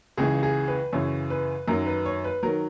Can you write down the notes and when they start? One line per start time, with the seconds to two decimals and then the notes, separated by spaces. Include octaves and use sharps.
0.17 C#2 C#3 E3 G#4
0.43 G#4
0.68 B4
0.93 F#2 C#3 E3 C#5
1.30 B4
1.68 F#2 D#3 F#3 A#4
1.86 B4
2.06 C#5
2.24 B4
2.43 D#3 F#3 A#4